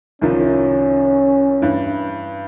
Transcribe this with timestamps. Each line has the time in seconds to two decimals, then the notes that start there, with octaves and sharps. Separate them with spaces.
0.22 C2 D#3 F3 C#4
1.62 G2 E3